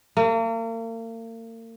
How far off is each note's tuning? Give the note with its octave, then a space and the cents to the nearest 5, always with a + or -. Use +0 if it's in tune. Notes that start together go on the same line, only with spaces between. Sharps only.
A#3 -40